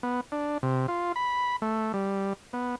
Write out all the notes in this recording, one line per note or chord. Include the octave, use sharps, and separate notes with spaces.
B3
D4
C3
F4
B5
A3
G3
B3